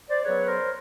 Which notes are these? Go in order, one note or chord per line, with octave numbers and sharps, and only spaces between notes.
C5 D5
C#3 F#3 B3 B4 C#5
B4
A#4 C5